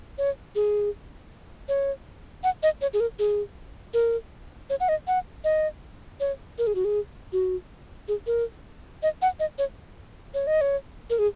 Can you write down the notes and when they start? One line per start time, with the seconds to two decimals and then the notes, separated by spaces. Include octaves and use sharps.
0.18 C#5
0.55 G#4
1.69 C#5
2.44 F#5
2.63 D#5
2.81 C#5
2.93 G#4
3.00 A#4
3.19 G#4
3.94 A#4
4.70 C#5
4.80 F#5
4.89 D#5
5.07 F#5
5.44 D#5
6.20 C#5
6.58 A#4
6.67 G#4
6.75 F#4
6.85 G#4
7.33 F#4
8.08 G#4
8.27 A#4
9.03 D#5
9.22 F#5
9.40 D#5
9.58 C#5
10.34 C#5
10.47 D#5
10.61 C#5
11.10 A#4
11.19 G#4